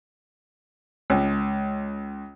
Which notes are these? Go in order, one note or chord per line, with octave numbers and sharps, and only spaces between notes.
C#2